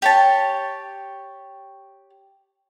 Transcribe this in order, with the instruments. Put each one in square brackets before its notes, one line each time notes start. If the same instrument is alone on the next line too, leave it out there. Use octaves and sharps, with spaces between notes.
[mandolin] G4 C#5 A5